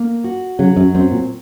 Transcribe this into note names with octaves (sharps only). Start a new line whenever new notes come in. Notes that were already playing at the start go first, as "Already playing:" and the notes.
Already playing: A#3
F#4
C#3 F#3
F#2
F#2 C4
A#2